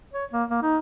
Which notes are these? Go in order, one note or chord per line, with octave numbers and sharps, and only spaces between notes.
C#5
A#3
A#3
D#4